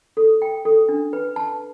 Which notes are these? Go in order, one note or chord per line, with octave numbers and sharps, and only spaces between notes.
A4
G5
A4
D4
B4
A5